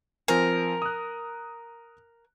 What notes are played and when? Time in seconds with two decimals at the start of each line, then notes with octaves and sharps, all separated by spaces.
0.28 F3 C4 A#4 G#5
0.82 D#6 F#6